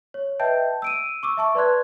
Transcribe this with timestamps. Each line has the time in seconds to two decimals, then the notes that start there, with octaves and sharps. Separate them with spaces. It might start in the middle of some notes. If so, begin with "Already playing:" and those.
0.14 C#5
0.40 B4 D#5 E5 G5 A5 G6
0.82 E6 D7 D#7
1.23 C#6 D6 E6
1.37 E5 A5 C#6
1.55 B4 D5 C6 F#6 G#6